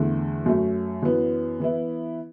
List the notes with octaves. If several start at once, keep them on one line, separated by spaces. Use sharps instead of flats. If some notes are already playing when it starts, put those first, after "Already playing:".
Already playing: E2 D3 A3
F#2 F#3 A3
F#2 E3 B3
E3 B3 E4